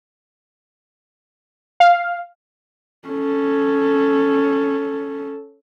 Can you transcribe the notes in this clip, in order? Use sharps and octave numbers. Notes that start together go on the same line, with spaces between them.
F5
C#4 A4